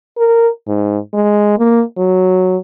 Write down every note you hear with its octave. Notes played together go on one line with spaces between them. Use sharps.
A#4
G#2
G#3
A#3
F#3